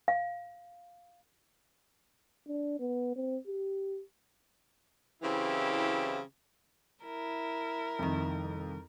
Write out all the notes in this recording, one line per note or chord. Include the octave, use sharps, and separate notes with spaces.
F5
D4
B3
C4
G4
C#3 E3 F#3 C4 E4 G4
E4 A#4
C2 F2 D#3